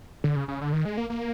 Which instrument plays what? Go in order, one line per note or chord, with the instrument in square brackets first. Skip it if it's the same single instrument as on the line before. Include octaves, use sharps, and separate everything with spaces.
[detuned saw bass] D3
C#3
C#3
D3
D#3
G#3
A#3
A#3